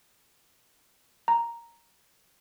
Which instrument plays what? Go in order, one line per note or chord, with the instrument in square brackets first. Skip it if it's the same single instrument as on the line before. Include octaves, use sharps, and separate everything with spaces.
[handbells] A#5